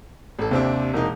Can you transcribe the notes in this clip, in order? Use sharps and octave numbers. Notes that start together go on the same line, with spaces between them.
A1 A4
D#2 C3 C4 D4
E1 A#3 D#4